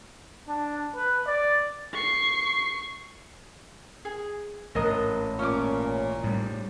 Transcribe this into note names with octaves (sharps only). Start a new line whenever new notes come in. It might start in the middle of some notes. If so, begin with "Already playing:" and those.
D4
B4
D5
C#6 C7
G#4
A1 G#2 A#4 D#5 F#6
A#2 C#4 G#5 D6
A2 G3